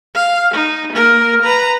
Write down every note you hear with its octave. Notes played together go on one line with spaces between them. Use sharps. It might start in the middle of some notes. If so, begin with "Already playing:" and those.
F5
D#4
A#3 A#4
B4 A#5